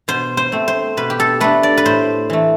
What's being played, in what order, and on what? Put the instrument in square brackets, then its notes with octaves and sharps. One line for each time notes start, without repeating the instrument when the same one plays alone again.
[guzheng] B2 C5
C5
A3 C4
C5
B2 B4
G4
A4
A3 D4 B4
D5
B4
A2 C5
E3 A3